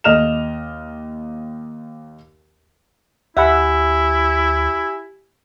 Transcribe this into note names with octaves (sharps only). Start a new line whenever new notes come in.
D#2 D#5 F6 E7 F7
D2 E4 G4 E5 F#5 G#5 B5